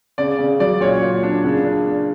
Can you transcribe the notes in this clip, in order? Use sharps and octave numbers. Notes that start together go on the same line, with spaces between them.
C#3 D5
C#3
F#3 D5
A#2 C#5
A#2
D4
C#3
D4
D4